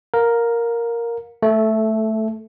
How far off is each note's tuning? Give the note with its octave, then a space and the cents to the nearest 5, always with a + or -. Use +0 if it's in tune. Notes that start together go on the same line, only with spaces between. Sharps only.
A#4 +0 F5 +30
A3 +0 A4 -20